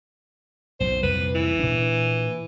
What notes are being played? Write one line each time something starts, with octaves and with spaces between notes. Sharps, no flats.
B1 F#2 A2 C5
C2 F2 A#2 B4
E3
A#2 D4